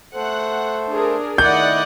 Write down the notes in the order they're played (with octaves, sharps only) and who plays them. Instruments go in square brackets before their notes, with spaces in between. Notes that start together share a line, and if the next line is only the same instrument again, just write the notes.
[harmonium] A3 A4 C5 [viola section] F#5
[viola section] D4 G#4 A#4
[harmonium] D#3 A3 E4 [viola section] D5 D#5 F#5 [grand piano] G6